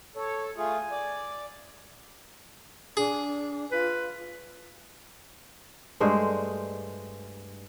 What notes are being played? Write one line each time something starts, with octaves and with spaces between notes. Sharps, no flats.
A4 C#5
A3 F4 G#4 G#5
D5
D4 G#4
F4 B4
G2 G#3 A3 C5